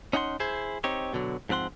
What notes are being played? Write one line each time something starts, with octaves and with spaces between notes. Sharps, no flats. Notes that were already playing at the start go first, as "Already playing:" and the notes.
C#4 D#4 F#5 G5 C6
E4 G#4 C5
C4 D#4 G4 C#5
B2 D3 F#3
G#2 F3 C4 F#5 C6